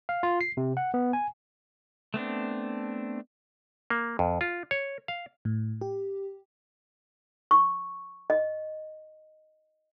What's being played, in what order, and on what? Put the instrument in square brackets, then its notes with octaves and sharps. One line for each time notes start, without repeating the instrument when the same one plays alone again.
[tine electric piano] F5
F4
C7
C3
F#5
B3
G#5
[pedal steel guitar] A3 B3 C4 D4
[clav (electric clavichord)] A#3
F2
F4
C#5
F5
[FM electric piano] A2
G4
[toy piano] C#6
D#5